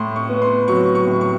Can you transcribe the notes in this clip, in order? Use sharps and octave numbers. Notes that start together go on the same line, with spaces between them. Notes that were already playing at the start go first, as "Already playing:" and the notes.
Already playing: A2 C6
C#6
B3
C6
F#3 C#6
C#6
A2
C#6